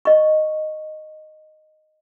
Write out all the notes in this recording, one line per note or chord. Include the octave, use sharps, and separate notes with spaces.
D#5 C#6